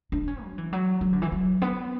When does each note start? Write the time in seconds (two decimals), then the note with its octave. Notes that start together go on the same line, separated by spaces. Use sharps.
0.12 D4
0.28 C#4
0.43 F#3
0.58 E3
0.73 F#3
1.01 F#3
1.13 D3
1.22 E3
1.32 F#3
1.62 B3